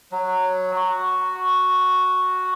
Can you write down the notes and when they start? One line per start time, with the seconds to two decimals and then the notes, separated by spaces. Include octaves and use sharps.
0.12 F#3
0.76 F#4